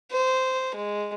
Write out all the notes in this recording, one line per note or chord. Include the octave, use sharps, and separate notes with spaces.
C5
G#3